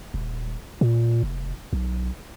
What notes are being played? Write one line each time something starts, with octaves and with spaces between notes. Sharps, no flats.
D#1
A#2
F1
B1